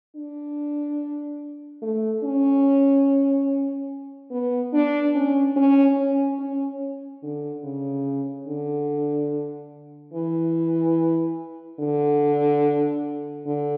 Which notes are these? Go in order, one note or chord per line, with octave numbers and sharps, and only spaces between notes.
D4
A3
C#4
B3
D4
C#4
C#4
C#4
C#4
D3
C#3
D3
E3
D3
D3